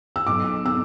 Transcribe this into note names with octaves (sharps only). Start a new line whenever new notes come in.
E6
B1 B2 D6
B2 E6